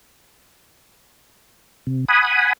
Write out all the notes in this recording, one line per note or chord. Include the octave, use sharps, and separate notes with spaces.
C3
F#5 G#5 B5 D#6